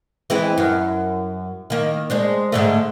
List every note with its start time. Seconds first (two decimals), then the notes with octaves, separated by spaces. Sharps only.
0.30 E3 G#3 C4
0.58 F#2
1.70 D#3 A#3
2.10 G#3 C4 D4
2.52 G#2 D3 A3